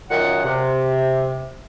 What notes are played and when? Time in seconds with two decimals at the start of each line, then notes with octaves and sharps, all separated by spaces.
0.10 F#2 A#2 D#3 F#5
0.45 C3